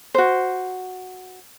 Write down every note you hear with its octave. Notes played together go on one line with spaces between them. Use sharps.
F#4 C5